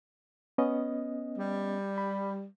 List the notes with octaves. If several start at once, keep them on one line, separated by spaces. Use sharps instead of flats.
B3 C#4 D#5
G3
B5